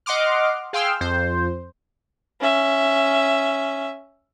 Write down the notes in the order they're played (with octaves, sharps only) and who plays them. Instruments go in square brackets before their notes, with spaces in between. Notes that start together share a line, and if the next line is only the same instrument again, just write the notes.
[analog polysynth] D#5 F#5 C6 D6 F6
G#4 F5 G5 C6 E6 F6
F2 C5
[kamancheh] C#4 E5